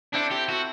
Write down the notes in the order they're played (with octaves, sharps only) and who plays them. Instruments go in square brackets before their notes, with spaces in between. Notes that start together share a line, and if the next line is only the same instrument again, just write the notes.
[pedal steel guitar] C4 E4 A4 C5 [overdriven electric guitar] D4
[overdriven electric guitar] G4
F#4